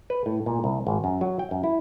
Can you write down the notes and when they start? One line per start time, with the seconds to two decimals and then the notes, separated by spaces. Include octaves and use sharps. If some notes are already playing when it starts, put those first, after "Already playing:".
0.10 B4
0.26 A2
0.46 A#2
0.64 C2
0.87 G#1
1.04 F#2
1.21 F#3
1.39 G5
1.51 F#2
1.64 E4